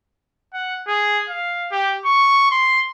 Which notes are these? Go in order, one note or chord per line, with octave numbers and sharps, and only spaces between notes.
F#5
G#4
F5
G4
C#6
C6